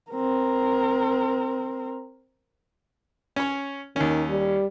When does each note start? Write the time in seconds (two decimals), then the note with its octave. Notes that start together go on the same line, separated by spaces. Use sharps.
0.12 C4 A#4
3.36 C#4 C#5
3.96 D#2 D#3 C#4
4.29 G3